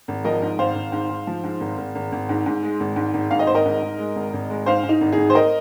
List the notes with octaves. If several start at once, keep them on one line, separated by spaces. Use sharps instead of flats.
G#1
F3 A#4 D#5
G#2
G#1 C5 F5
G#1
G#2
G#2
F3
G#2
G#1
G#1
G#1
G#1
G#2
G#2
G#3
G#1
G#2
G#1
G#2 F5
D#5
G#1 C5
A#4 D#5
G#2
G#2
G#3
G#1
G#1
G#3
G#2 C5 F5
G#2
D#4
G#1
G#1 D#4 G#4
C5
A#4 D#5